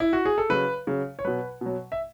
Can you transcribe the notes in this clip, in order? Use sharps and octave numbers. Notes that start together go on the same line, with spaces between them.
E4
F#4
G#4
A4
C#3 F#3 B4
C#3 F#3
C#5
B2 F#3 B4
B2 F#3
E5